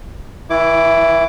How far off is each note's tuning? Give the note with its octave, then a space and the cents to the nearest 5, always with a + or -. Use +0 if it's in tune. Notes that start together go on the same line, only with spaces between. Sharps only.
E3 -35 E4 +10 D6 +0